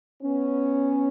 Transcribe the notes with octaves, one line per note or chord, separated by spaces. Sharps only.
B3 C#4